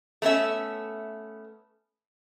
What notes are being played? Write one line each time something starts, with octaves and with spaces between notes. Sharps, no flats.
A3 B3 C#4 E5